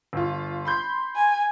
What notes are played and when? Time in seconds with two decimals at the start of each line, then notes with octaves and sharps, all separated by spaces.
0.13 G1 F4
0.65 B5 C6 G6
1.15 G#5